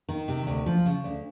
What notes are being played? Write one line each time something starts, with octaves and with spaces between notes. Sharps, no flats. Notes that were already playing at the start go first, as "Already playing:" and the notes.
D#3
C3
D2
F3
C#3
D2